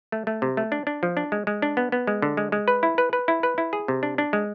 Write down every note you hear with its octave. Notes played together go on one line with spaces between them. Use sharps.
A3
A3
C3
A3
D4
D4
F3
D4
G#3
G#3
D4
B3
B3
G#3
D3
G#3
G#3
B4
E4
B4
B4
E4
B4
E4
G#4
C3
D4
D4
G#3